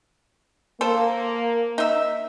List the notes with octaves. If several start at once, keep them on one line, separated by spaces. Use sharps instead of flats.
A#3 A4 C5
D#4 E5